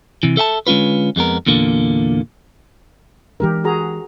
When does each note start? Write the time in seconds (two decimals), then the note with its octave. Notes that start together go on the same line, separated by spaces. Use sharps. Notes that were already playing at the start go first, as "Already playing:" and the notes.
0.23 C3 E3
0.37 A4 E5 G#5 A5
0.67 D3 G#3 C#4 F4 B4
1.16 F2 G#3 B3 A#4
1.46 E2 A#2 D3 A#3
3.40 E3 G#3 D4 G4 A#4
3.64 F#4 G#4 A#5